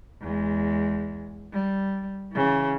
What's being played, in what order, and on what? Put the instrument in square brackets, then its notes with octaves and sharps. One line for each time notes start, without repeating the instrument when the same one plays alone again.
[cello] E2 G#3
G3
C#3 E3